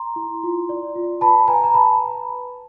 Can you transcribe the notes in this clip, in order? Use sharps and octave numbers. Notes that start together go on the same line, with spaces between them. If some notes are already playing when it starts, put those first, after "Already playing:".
Already playing: A#5 C6
E4
F4
D5
F4
B4 A5 B5
B4 G#5 A#5
A#5
B4 A5 B5